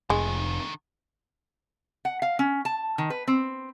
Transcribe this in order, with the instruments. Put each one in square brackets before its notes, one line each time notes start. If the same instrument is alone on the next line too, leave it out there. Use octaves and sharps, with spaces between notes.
[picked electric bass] F1 [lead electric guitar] D3 D#3 [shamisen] G#3
[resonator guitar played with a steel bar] F#5
F5
C#4
A5
D#3
B4
C4